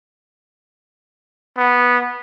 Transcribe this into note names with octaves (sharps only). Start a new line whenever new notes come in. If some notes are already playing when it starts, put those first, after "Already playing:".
B3